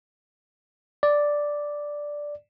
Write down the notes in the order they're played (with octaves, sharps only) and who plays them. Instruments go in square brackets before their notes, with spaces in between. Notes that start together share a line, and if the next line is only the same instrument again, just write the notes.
[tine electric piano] D5